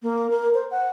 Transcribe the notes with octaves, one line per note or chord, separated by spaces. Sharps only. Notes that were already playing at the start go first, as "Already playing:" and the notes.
A#3
A#4
C5
F#5